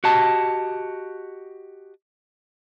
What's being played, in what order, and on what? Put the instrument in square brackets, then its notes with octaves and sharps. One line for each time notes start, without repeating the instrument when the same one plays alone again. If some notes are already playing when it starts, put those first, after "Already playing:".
[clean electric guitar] F#4 G4 D#5 A5